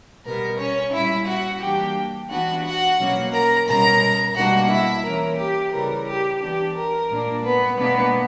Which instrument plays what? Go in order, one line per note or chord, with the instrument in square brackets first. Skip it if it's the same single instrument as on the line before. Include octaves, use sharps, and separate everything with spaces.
[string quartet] B2 G3 B3 A#4
C#4 C#5
A#2 G3 C#4 E4 E5
F#4 F#5
E3 G3 A#3 D4 G4 G5
E3 B3 D4 F#4 F#5
F#4 F#5
B2 F#3 A#3 C#4
A#4 A#5
B2 G3 C#4 A#4 A#5
B2 G3 A#3 D4 F#4 F#5
E4 E5
E3 A#3 C#4 A#4
G4
C#3 E3 G3 A#4
G4
E3 B3 D4 G4
A#4
A#2 A#3 D4
B3 B4
B2 A#3 B3 D4 B4